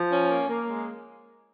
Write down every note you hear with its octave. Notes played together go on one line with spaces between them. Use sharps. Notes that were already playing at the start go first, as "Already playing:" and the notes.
Already playing: F3
C#4
A#3
A#3
G#3